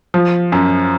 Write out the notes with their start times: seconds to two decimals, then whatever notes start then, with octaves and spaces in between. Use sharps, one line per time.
0.14 F3
0.52 F#2